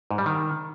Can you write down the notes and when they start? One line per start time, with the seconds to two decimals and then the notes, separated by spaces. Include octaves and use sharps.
0.11 G#2
0.18 G3
0.26 D#3